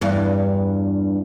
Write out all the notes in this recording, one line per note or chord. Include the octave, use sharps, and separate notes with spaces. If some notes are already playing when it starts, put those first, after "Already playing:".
E2 G2